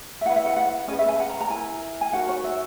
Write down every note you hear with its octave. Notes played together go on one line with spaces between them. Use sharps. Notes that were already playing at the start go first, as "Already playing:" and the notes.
E5
E4 B4 F#5
E5
F#5
F#5
C#4 G#4 B4 D#5
E5
G#5
F#5
A#5
A#5
E4 A#4 G#5
G#5
D#4 F#4 A#4 F#5
C#5
E5